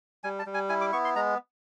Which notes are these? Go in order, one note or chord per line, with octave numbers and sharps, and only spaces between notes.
G3 G#5
A5
G3
G#5
E4 G#5
D6
B3 C#6
C6
G#3 A#5